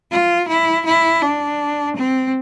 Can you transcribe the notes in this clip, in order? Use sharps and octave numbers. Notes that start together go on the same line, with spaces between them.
F4
E4
E4
D4
C4